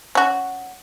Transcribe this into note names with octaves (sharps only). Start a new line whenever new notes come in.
C#4 F#4